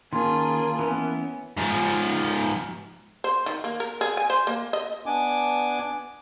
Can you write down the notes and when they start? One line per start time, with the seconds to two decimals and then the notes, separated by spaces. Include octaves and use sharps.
0.13 D#3 A#3 C#4 F4 G#4 A5 C6
0.79 E3 B3 C#4
1.57 G#2 F3
3.24 C5
3.46 D#3
3.64 A#3
3.80 A#4
4.01 G#4
4.17 G#5
4.30 C5
4.47 A#3
4.73 D#5
5.06 B3 D4 G#5 D6